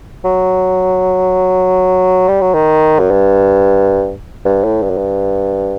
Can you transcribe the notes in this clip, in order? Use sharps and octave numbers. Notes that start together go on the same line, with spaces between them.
F#3
G3
F#3
D#3
F#2
G2
G2
A2
G2
F#2
G2